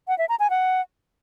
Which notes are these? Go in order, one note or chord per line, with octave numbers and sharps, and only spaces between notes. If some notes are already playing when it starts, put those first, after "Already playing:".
F#5
E5
A#5
G#5
F#5